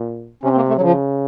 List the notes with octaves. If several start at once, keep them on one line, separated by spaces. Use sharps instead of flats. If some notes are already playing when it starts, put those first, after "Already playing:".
Already playing: A#2
C3 C#4
C4
A#3
A3
F#3
C#3 F3